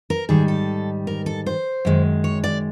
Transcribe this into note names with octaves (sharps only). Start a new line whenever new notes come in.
A#4
G#2 D#3 G3 G#4
A4
A#4
A4
C5
F#2 D#3 G#3
C#5
D5